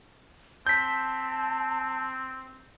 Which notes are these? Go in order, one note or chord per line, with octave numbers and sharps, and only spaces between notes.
C4 A5 G6 B6